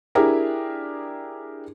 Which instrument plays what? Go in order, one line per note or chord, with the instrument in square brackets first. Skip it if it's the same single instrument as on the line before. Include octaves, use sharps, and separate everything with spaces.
[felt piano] D4 E4 G4 G#4 A#4